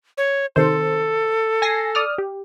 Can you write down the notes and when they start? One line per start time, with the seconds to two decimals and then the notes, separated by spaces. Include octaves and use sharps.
0.18 C#5
0.56 C3 D#3 A4 C5
1.62 G#5 A#6 C7
1.95 D5 D#6 F6
2.18 G4